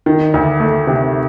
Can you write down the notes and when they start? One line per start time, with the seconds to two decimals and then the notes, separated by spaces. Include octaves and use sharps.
0.06 D#3
0.34 D2
0.60 A3
0.87 C3